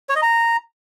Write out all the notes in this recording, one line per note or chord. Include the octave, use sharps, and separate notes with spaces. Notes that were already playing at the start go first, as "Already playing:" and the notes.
C#5
D#5
A#5